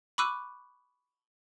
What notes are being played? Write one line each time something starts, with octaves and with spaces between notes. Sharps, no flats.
B5 C#6 D6 E6 F#6 D#7